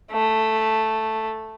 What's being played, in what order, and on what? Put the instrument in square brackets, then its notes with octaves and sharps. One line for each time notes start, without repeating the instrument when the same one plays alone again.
[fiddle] A3